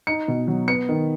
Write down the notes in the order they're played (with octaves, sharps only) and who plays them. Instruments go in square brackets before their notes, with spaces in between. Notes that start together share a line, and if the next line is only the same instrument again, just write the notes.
[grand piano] D#4 C#7
B2
F#3
B3 C#7
D#3